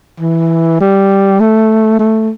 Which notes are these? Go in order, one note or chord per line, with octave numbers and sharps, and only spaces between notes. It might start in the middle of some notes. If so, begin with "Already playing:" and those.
E3
G3
A3
A3